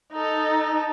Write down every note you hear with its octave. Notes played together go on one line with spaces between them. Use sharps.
D#4 A4